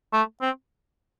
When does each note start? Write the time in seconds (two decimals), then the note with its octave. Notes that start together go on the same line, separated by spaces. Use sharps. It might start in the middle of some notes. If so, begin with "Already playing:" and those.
0.13 A3
0.42 C4